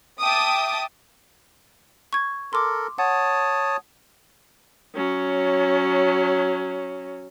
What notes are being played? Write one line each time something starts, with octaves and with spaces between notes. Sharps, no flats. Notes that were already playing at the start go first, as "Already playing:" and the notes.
E5 G5 A5 D6 D#6
C#6 G#6
A4 A#4 C6 D6
C#5 F#5 A5 D#6
F#3 C#4